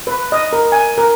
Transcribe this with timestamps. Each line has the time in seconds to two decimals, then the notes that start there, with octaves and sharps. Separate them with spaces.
0.07 B4
0.32 D#5
0.53 A#4
0.72 G#5
0.98 A#4